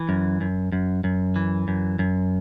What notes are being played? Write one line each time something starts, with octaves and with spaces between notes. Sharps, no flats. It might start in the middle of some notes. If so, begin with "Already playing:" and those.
Already playing: E3
F#2
F#2
F#2
F#2
E3
F#2
F#2